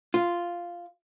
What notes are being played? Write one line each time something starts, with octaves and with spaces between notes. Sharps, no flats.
F4